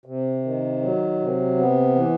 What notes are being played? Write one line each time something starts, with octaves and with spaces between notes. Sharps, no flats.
C3
D#3
F#3
C3
B3
E3